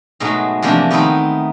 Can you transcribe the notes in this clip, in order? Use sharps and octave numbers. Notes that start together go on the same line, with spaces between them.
G#2 B2 F#3 G#3 A3
C3 E3 F3 A3 A#3 D4
D#3 A3 B3 C4 D#4 E4